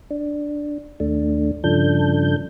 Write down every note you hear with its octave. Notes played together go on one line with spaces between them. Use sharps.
D4
D#2 A3 D4
G2 C#3 F3 D4 A4 G6